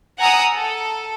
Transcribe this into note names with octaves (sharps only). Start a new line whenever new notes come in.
F#5 G#5 A#5 D#6 E6
A4